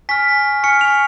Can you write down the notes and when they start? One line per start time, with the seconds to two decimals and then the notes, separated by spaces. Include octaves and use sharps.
0.09 G#5 C#6 F6 B6
0.63 G#5 C#6 F6 C#7
0.81 F7